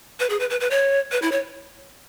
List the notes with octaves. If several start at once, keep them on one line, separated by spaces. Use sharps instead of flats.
B4
G#4
B4
B4
B4
C#5
B4
E4
C#5